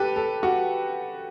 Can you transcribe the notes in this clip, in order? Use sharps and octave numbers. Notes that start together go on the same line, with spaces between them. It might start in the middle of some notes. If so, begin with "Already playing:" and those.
Already playing: G4 A4 B4
A4
F#4